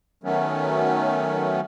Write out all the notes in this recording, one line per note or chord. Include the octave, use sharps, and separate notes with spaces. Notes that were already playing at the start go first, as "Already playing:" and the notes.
D#3 F#3 A3 B3 C#4